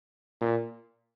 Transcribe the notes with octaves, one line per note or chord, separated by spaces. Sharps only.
A#2